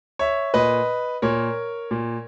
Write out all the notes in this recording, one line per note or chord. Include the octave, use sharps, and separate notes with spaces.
C#5 E5
A#2 B4 D#5
A#2 A#4 C#5
A#2